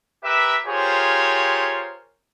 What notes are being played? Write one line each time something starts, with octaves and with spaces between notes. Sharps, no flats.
G4 A#4 B4 E5
F4 G4 G#4 A#4 C5 C#5